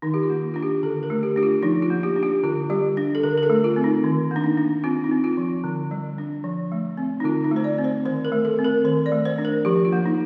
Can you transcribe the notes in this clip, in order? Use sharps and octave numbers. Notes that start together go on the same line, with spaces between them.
D#3 D#4
G4
F4
A#3
D4 F4
G4
D3 A4
A#4
A3
G4
D4 G4
F4
F3 D#4
F4
A#3
G4
D4
G4
D3 F4
G3 G4
D4
A4
D3 A#4
A#4
A4
A3
F4
C4
D#4
D#3
A#3 D4
D#4
D4
C4 F4
D#4
C4
F4
F3
D3
G3
D4
F3
A3
C4
D#4
D3 F4
D#4
A3
C5
D5
C4
C5
D#3 C5
A#4
A3
A4
C4
A#4
D#3 C5
D5
A3
C5
D4
A#4
F3 G4
F4
A#3
D#4